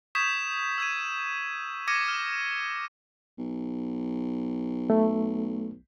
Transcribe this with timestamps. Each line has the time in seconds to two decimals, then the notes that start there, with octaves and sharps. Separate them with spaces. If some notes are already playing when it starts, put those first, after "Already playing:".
0.15 C#6 D#6 G6 G#6 B6 E7
0.78 E6 G#6 D#7
1.88 D6 F6 G#6 A#6 C#7 D#7
2.08 F6
3.38 B1
4.90 A3